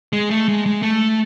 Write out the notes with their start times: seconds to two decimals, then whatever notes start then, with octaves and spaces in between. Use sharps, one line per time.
0.13 G#3
0.31 A3
0.48 G#3
0.66 G#3
0.82 A3